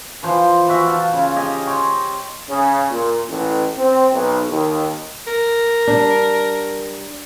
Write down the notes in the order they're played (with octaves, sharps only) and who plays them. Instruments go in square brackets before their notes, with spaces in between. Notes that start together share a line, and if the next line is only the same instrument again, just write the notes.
[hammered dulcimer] E3 F3 C5 C6
E3 F#4 E5 G5
F4 A5
C#3
G4 G#4 D#5
C#5 G5 C6
[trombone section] C#3
A#2
A1
C4
B1
D#2
[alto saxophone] A#4
[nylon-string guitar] G3 D4